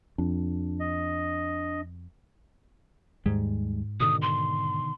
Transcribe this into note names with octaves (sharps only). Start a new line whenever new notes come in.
F2 D4
D#5
D#2 G#2 G3 G#3
B2 D3 D#3 D#6
C6